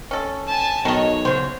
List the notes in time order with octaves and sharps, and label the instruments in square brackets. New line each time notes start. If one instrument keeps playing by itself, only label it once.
[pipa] C#4 A4
[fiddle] G#5 A5
[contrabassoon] B1 [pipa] D#3 A5 [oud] F#4 D#5 [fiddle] C#5
[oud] C#3 F#3 [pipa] C5